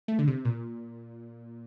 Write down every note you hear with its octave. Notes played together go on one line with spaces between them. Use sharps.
A3
D3
C3
A#2